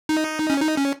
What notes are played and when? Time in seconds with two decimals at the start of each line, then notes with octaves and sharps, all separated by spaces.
0.09 D#4
0.50 C#4
0.61 D#4
0.77 C#4